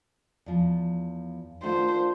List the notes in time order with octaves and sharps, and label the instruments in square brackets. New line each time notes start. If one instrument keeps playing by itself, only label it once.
[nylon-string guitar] E2 F3
[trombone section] D#3 D4 F4 [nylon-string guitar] A3 F#5 [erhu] C5